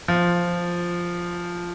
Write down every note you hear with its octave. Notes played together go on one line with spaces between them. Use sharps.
F3